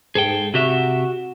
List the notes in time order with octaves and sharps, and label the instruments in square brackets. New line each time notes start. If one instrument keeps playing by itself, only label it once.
[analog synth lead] G#2 [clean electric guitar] G#4 A4 G5
[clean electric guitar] C3 G4 E5 [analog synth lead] F#4